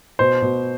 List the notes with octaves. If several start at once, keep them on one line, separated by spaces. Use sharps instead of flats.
B2 C5
B2